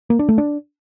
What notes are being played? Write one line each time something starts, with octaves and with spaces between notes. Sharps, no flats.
A#3
D4
A3
D4